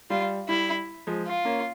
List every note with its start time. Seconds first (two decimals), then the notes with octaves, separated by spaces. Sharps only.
0.10 G3 F4
0.49 G3 E4
1.07 F3 G#3
1.27 F4
1.45 A#3 C#4